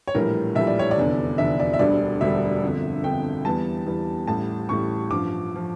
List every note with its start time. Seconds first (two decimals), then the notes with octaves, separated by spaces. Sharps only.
0.07 C#5
0.14 A#1 A2 E3 G3 A#4
0.55 A#1 A2 E3 G3 E5
0.67 D5
0.79 C#5
0.91 D5
0.97 F1 E2 D3
1.38 F1 E2 D3 E5
1.60 D5
1.74 E5
1.79 E1 D2 D3 G3 D5
2.21 E1 D2 D3 G3 E5
2.63 G1 F2 D3
3.04 G1 F2 D3 G5
3.45 E2 E3 G3 A5
3.86 E2 E3 G3
4.27 A1 A2 G3 A5
4.69 A1 A2 G3 C#6
5.10 A1 G2 F3 D6
5.56 F3